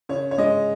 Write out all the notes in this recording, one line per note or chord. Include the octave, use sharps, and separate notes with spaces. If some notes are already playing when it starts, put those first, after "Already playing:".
C#3 C#5
C#5
G#3 D#5